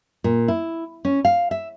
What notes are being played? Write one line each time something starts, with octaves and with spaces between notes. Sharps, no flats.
A#2
E4
C#4
F5
E5